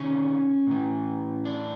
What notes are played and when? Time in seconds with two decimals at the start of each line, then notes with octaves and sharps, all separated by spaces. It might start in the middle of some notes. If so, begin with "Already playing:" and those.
Already playing: C3 D#3 C#4
0.67 A2 E3
1.45 D4